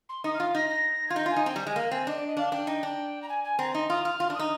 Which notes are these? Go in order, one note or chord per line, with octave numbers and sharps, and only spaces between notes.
C6
D#4 D#6
F6
F4
D#4 A#6
A#6
F4 G#6
D#4 G6
F4
G#5
D#4
C4 G5
G3 G5
G#3 G#5
A#3 A#5
C4 G#5
D4 D#5
D5
D#5
D4 F5
D4 G5
D#4
D4
A#5
G#5
G#5
C4 A#5
D#4 C6
F4 D#6
F4 F6
F4
D4
D#6
D#4